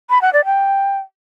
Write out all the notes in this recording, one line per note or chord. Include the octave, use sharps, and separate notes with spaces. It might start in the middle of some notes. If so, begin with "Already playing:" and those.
B5
F#5
D5
G5